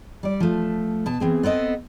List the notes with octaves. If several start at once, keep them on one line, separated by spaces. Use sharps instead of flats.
G3 D5
F3 A3
B2 A5
E3 C4 G#4
B3 C4 A4 D#5